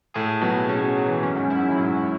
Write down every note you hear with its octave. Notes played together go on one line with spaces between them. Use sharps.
A2 G#4
B2 F#3
B2 C#4
F#3
E3
F#2 C#4
G#2
F#2 E4
G#2
F#2
F#3
G#2